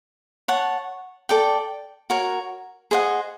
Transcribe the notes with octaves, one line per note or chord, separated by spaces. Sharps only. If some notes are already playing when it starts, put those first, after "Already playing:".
C#5 F#5 A5
A4 D5 G5
F#4 A#4 C#5
G#4 C5 D#5 F#5